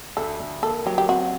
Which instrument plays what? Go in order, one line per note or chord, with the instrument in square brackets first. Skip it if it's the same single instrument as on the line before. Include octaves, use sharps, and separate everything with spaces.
[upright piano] D2 [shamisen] A4
[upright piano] D2
[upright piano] A#3 [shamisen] A4
[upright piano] F#3 [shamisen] G4
[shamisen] G4
[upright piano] C4 [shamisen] F#4